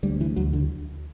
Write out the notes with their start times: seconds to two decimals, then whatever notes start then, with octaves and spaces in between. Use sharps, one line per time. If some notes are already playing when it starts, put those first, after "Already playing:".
0.03 D2 G3
0.21 E3
0.36 D2 F#3
0.53 D3